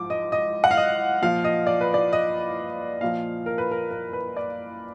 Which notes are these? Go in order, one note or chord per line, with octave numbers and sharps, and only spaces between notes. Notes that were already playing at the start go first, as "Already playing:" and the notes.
Already playing: G#2 F3 D6
D#5
D#5
F#5
F5
D#5
A#2 F3 F5
D#5
D5
B4
D5
D#5
A#2 F3 F5
A#4
B4
A#4
A#4
B4
D5